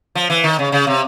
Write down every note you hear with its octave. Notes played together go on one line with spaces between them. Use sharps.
F3
E3
D#3
C#3
C#3
C3